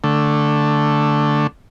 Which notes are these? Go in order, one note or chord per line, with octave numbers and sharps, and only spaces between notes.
D3 A3